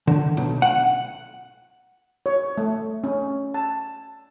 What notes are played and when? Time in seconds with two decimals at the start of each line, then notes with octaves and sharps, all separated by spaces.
0.07 D3
0.37 B1
0.62 F#5
2.26 C#5
2.58 A3
3.04 C#4
3.54 A5